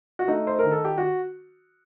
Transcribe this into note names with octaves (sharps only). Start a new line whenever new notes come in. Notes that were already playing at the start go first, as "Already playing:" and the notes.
F#4
A3 D#4
C5
D#3 A#4
A4
G4
F#4